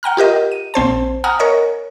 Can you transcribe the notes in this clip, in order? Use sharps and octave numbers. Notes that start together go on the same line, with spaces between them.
F#5 G5 A#5 F6
F4 G4 A#4 D#5
D#7
A#1 C4 C5 A5
F#5 G#5 A#5 D#6 F6
A#4 C#5 D#5